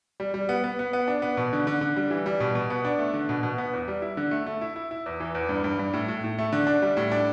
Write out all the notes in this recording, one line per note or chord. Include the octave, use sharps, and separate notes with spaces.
G3
G3
B3
B3
B3
B3
D4
B3
B2
D3
D3
D3
G3
E3
G3
B2
B2
B3
D4
A3
D3
B2
B2
B3
E2
G3
E4
D3
A3
A3
E4
E4
E4
E2
E3
E2
G2
G2
G2
A2
A2
A2
A3
D3
D4
G3
A2
D4